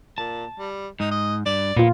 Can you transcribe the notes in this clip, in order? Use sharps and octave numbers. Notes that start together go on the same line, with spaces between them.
A#2 A5
G3
G#2 D#4
D#5
G2 D5
A#2 A#3 B3 F4